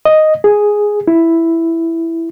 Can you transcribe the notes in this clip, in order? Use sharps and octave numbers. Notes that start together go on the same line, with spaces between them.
D#5
G#4
E4